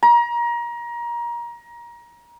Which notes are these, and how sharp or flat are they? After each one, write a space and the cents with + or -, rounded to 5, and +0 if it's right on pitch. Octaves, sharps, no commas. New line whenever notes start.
A#5 +25